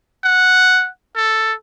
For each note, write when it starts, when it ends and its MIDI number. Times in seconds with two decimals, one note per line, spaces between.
0.24 0.88 78
1.16 1.53 69